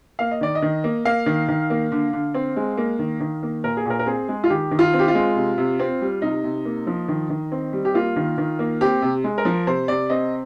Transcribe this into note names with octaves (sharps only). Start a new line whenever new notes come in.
A#3 F5
D#5
D#3 D5
D#5
D#3
A#3
A#3 F5
D#3
D#3
A#3
D3
D3
C4
G#3
A#3
D#3
D#3
A#3
A#2 A#4
G#4
A#2 A#4
A#4
C4 G#4
G#3
F4
D#3 G4
D#3
F4
C4
G4
F4
G#3
C3
C3
C4
G3
C3 D#4
C3
A#3
F3
D#3
D#3
C4
G3
G4
A#3 F4
D#3
D#3
A#3
C4 G4
C3
G#3
A#4
F3
C3 C5
C3 D5
C4 D#5